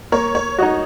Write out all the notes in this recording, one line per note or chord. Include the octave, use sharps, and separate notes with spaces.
A#3 C#5
C#5
D#4 F#4 D#5